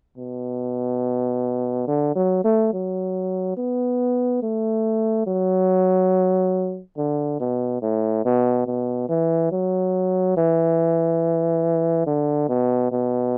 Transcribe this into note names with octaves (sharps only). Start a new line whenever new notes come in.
B2
D3
F#3
A3
F#3
B3
A3
F#3
D3
B2
A2
B2
B2
E3
F#3
E3
D3
B2
B2